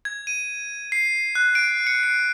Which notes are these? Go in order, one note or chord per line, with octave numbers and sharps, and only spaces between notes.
G#6
D#7
C7
F#6
D7
C#7
C7